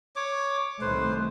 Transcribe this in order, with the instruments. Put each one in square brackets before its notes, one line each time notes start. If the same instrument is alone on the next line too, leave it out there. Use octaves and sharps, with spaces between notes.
[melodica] C#5 D6
[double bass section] C2 D#3 A3 [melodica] B4 C5